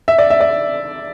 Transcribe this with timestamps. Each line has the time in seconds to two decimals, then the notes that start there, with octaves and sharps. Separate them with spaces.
0.08 E5
0.18 D5
0.30 E5
0.41 D5